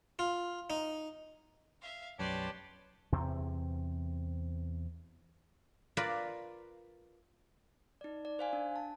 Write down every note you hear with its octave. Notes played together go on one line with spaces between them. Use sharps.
F4
D#4
E5 F5
B1 F#2 G4 B4 C#5 D5 A5 C6
E2 C3 C4
F4 A#4 B4 D5
D#4 D5
D5
C5 F5 G#5
D4
A5